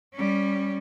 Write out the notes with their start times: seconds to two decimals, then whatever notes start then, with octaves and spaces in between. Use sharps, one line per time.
0.14 G3 C#4